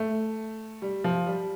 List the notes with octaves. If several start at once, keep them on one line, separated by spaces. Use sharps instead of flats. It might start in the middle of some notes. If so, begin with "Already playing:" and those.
Already playing: A3
G3
F3
G3